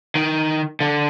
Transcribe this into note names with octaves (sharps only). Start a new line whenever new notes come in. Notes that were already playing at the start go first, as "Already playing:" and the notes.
D#3
D3